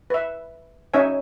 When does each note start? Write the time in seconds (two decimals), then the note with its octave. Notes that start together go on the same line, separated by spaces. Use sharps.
0.10 B4 E5
0.94 C#4 D#4 C#5 E5 G#5